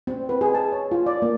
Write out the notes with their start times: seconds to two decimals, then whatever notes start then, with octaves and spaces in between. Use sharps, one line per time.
0.07 C4
0.29 B4
0.41 G#4
0.55 A5
0.72 C#5
0.92 F4
1.06 D5
1.22 A#3